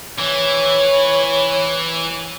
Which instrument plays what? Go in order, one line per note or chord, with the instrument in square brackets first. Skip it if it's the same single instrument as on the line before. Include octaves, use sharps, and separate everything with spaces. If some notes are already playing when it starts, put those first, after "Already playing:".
[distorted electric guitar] E3 [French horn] C#5